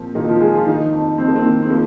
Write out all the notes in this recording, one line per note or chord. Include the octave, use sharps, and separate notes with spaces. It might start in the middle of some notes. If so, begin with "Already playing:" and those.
Already playing: A#2 F3 C4
A#2 D#3 D#4
F3 F4
F3 G#3 G#4
F3 F4
D#3 D#4
F2
F2 C4
A#3
C4
D#3
C4
F3 A#3